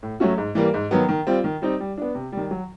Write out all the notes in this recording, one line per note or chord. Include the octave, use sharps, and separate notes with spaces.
A2
F#3 A3 C#4 F#4
G#2
E3 G3 A#3
G#2
D#3 F#3 B3
D#3
G3 C4 F4
D#3
G3 C4 D#4
G3
B3 D4
C3
D#3 G3
F#3